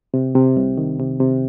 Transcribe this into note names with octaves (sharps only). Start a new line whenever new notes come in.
C3
C3
C2
D#3
C3
C3